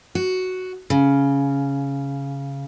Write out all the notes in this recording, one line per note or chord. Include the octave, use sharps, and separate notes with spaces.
F#4
C#3